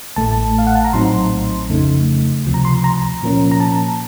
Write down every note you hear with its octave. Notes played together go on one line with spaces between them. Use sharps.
A1 A2 A3 A5
F5
F#5
A5
A#5
A#1 A2 F#3 C4 D#4 C6
F2 C#3 A3 D#4
C#2 C3 F3
A#5
C6
A#5
A#2 F3 A#3 C#4
A#5
A5